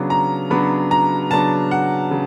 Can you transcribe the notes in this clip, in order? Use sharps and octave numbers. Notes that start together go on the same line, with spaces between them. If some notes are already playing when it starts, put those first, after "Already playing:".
Already playing: C#3 F#3 B3 D4
A#5
C#3 F#3 B3 D4 B5
A#5
C#3 F#3 B3 D4 A5
F#5
C#3